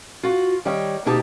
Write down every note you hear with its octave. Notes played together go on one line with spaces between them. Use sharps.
F4 F#4
D#3 G3 C#5 D#5 G5
D2 B2 A#3 D#4 G4 A5